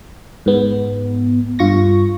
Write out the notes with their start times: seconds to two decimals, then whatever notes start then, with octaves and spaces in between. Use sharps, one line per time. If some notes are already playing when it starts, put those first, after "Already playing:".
0.46 G#2 B3
1.59 G2 F4 C#6 A#6